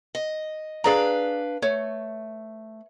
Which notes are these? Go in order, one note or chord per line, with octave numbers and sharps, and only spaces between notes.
D#5
D4 G#4 B4 D5 F5 A#5
A3 C#5